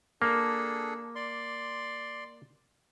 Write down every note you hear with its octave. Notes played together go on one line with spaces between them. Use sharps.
A#3 D4 G#4 A4
D5 C6